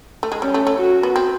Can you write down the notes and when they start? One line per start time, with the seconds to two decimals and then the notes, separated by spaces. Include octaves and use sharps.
0.23 A3
0.32 G#3
0.42 G3 C#4
0.54 A3
0.67 A3
0.78 F#4
1.03 B3
1.16 C4